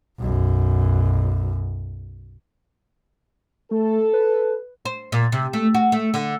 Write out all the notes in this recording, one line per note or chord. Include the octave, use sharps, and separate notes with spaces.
B1 F#2
A3 A4
B4
C5
A#2
C3
A3
F#4
A3
D3